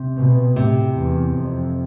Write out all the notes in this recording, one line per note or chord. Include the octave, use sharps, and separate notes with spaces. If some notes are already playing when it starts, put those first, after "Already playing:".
Already playing: C3
B2
A2 C3
E2
F2